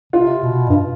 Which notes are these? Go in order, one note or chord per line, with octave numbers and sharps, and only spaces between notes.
C3 F4
B2
G2